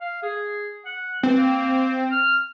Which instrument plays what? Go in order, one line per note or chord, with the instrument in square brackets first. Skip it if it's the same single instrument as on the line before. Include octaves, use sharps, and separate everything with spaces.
[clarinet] F5
G#4
F#5
[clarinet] E3 [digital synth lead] C4
[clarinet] A#3
F6